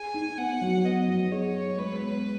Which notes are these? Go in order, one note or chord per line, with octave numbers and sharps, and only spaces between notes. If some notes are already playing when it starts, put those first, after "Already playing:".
Already playing: G#4 G#5
D#4
B3 F#5
F#3
B3 D#5
F#3
G#4 C#5
G#4
G#3 B4
B3